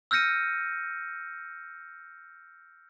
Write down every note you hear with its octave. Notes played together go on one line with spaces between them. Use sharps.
E6 F6 G6 A#6 C#7 D#7